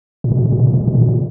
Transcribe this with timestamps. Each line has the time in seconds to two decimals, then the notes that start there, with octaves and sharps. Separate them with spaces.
0.24 A#2
0.32 B2
0.38 A#2
0.45 B2
0.52 A#2
0.59 B2
0.67 A#2
0.74 B2
0.81 A#2
0.88 B2
0.95 A#2
1.02 B2
1.09 A#2